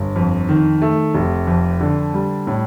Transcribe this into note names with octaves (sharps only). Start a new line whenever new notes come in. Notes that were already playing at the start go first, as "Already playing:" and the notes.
Already playing: G1
F2
D#3
A3
F1
F2
D3
G3
A2